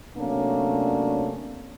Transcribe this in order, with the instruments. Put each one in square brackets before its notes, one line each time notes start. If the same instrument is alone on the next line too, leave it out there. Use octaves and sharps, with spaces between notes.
[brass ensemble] C3 F#3 A3 A#3 C#4 D4